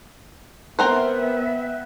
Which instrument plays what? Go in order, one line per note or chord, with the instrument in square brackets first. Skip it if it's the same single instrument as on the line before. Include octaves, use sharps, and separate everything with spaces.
[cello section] B3 E5 [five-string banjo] C4 A#4 C5 [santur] F#5 G5